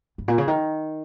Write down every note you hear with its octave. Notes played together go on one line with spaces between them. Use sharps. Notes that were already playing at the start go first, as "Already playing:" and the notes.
G2
A#2
C#3
D#3